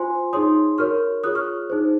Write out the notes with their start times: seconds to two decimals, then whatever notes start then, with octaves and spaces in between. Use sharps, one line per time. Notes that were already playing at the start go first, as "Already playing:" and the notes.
Already playing: F4 C5 G#5 C6
0.33 D#4 G#4 C#5 C6 D#6
0.78 F#4 A#4 C#5 C#6 F6
1.24 F4 G#4 C#5 D#6 F#6
1.35 C#6 F6
1.70 D#4 G#4 C5